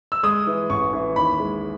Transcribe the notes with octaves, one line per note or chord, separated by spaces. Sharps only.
E6
G#3 D#6
E3
A1 C#6
E3
D#2 B5
G#3